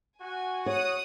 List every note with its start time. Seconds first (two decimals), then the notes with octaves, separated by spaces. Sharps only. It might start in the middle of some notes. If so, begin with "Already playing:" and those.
0.21 F#4 G#5
0.66 C#5 F#5 D#6